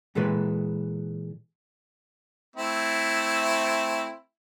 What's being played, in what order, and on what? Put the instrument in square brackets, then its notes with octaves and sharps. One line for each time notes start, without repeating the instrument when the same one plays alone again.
[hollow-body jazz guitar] A#2 E3 G#3 A4 B4
[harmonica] A3 C4 E4